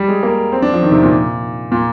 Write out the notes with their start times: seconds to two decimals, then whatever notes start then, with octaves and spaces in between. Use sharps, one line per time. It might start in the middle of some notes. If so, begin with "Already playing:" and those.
Already playing: G3
0.08 G#3
0.23 A#3
0.52 C4
0.62 D4
0.73 F3
0.83 D#3
0.92 C3
1.02 A#2
1.72 A#2